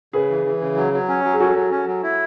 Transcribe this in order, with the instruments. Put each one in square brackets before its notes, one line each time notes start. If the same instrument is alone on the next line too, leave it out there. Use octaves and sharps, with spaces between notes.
[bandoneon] C#3 [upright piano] G#4 B4
[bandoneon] E3
E3
C#3
F#3
F#3
C#4
F#3
[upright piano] G#4
[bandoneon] C#4 [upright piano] F#4 A4
[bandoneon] F#3
C#4
F#3
E4